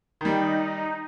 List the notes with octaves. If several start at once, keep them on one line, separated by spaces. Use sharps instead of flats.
D#3 G3 D#4